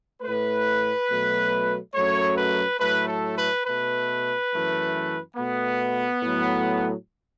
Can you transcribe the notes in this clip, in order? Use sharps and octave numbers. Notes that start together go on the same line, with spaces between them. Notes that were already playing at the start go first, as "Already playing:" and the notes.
A2 A3 B4
B2 F#3 A3
F#2 F#3 A3 C#5
B4
A2 F#3 A3 B4
A4
B4
B2 A3 B4
F#2 E3 A3
B2 A3 B3
A2 F#3 A3